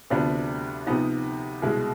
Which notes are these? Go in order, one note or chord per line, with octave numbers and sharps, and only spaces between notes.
D2 C3 F3 B3 D4
C3 F3 B3 D#4
C2 B2 G#3